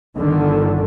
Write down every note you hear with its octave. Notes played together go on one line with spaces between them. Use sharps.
G1 D3 D#3